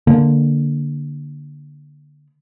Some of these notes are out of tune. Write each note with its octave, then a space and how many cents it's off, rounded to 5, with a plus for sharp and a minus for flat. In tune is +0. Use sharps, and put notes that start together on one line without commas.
D3 +0 A#3 +0